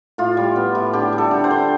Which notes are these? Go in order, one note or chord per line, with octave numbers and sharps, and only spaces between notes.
A2 F4
G3
B3
A2
D3 G4
G3
A4
D3
C5
D3